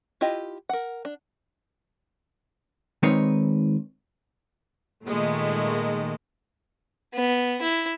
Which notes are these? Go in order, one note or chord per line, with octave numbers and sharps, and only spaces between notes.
E4 F4 G4 D#5
A#4 F#5
D4
D#3 G#3 C4 D#4 B4 C#5
A#2 D#3 G#3 A3
B3
E4